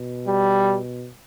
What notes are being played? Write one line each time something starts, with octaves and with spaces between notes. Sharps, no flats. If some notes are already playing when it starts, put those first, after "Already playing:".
Already playing: B2
G3